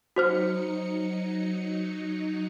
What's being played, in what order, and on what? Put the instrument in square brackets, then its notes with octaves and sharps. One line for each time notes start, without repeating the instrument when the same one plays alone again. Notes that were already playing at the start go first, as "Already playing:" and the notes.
[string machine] F#3 D#4 C#7 [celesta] F#4 C5 F6